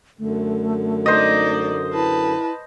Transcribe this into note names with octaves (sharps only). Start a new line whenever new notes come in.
F#2 D3 A3
D#4 C5 D5 D#5
E4 B4 A5